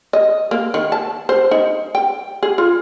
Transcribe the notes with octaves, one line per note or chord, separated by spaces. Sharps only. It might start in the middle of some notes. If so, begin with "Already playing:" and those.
D#5
A#3
D#3
A5
C5
D#4
G5
G#4
F4